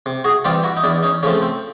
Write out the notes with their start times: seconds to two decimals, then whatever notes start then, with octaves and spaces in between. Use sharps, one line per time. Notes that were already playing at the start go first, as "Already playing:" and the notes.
0.06 C3
0.24 F#4 G#4
0.44 E3 G3 C4 F4 G4
0.64 E4 F#4
0.77 D#4
0.84 E2 D4 E4
1.03 C#4 D#4
1.23 C#3 F3 A3 C4 C#4
1.42 C4